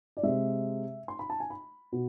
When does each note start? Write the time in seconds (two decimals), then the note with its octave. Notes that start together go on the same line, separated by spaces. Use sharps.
0.17 D5
0.23 C3 G#3 E5
1.08 C6
1.19 B5
1.30 A5
1.40 G#5
1.50 B5
1.92 B2